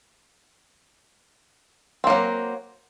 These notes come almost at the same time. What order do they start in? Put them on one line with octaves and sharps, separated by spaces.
C4 A#3 F#3